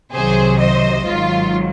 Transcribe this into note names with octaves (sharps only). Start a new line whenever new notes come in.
C2 C3 D#3 F#3 G#4 C5
C5 D#5
G#1 G#2 D#3 F#3 F4